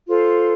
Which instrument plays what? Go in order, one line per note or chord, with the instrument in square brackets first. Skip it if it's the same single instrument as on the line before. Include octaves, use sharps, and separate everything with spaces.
[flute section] F4 A4 C5